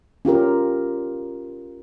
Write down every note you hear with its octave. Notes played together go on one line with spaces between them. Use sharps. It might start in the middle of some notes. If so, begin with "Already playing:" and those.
C#4 F4 G4 A#4